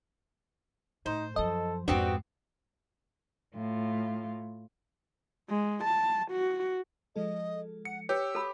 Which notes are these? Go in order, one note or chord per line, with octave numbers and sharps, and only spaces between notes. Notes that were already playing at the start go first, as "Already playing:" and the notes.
A2 D#4 C5
F#2 F3 A4 D#5
F2 G#2 B3 C4 D4 F#4 G4
A2 F4
G#3
A5
F#4
F3 G#3 A4 D#5
F#5 C#7
G4 B4 C#5 E6
A4 B5